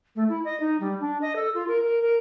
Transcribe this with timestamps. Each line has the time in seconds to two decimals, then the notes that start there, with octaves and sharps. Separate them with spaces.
0.15 A3
0.29 E4
0.45 D#5
0.60 D#4
0.80 G3
1.00 D4
1.21 D#5
1.35 A4
1.54 F4
1.68 A#4
1.83 A#4
2.02 A#4